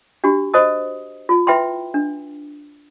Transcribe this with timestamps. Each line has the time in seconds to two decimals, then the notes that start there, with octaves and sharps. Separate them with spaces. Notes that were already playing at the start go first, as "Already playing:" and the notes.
0.24 D4 F#4 G4
0.54 F#4 C5 D#5 A5 D#6
1.29 F4
1.47 E4 B4 E5 G5 B5 C6
1.94 D4